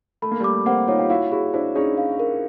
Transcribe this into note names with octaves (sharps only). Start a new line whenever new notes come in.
A3 B5
A#3
G3 A3 D6
A#3 C4 F#5
D#4 F4 C#5
F4 G4
E4 F#4 F5
E4 F#4 G#4
D4 E4 C5
C#4 D#4 G#4
F5
A#4